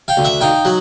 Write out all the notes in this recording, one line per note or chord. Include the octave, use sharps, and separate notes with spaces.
F5 G5
D2
E5 F#5
D#4 F5 G5
F#3 F#5